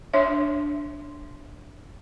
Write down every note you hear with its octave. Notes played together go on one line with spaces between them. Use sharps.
D4 C#5 E5